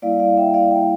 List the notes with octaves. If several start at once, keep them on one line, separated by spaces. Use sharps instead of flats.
G3 A#3 E4 D5 F5
D5 F5
E5 G5
D5 F5
E5 G5